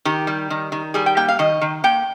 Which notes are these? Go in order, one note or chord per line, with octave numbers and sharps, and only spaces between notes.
D#3 G4
G3
D#3
D#3
G3 G#4
G5
A#3 G5
F5
D#3 D#5
D#3
A#3 G5